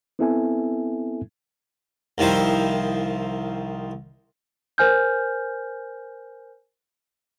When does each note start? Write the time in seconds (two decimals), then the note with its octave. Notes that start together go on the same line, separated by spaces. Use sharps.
0.19 B3 C4 E4 A4 E5 G#5
2.18 C2 D#3 F3 E4 C5
4.78 A#4 C5 G#5 F6 G6